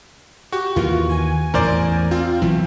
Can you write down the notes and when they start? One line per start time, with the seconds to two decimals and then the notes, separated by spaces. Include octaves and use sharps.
0.52 F#4 G4
0.76 D#2 D#3 E3 F4
1.10 G#5
1.54 A1 E2 A#4 C5 D5
2.11 C4 F4
2.42 B1 E3